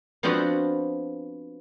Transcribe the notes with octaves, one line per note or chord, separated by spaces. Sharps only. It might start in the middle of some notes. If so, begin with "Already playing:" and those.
F3 B3 C4 D4 F4 F#4